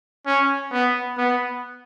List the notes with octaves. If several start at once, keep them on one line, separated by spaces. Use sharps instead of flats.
C#4
B3
B3